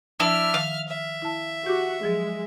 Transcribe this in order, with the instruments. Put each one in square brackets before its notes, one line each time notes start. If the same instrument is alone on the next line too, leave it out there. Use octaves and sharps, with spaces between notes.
[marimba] F3 [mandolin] D4 E4 [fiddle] E5 F6
[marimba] D#3 [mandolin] F5
[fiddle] E5
[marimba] E4 A5
[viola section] F#4 [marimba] G4 D6
[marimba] F3 F#3 [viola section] G#3